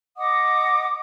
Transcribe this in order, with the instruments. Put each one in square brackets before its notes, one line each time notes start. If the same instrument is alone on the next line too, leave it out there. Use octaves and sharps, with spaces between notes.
[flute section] D#5 F#5 D6 D#6